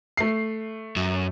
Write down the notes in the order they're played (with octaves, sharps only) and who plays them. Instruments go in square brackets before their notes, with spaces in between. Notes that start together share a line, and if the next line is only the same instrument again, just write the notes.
[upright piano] A3 C7
[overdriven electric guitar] F#2